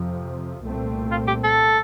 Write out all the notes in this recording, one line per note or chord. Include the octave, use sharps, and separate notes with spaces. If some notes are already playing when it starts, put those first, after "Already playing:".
Already playing: F2 C3 F3
C2 A#2 A3 C4
F4
G4
A4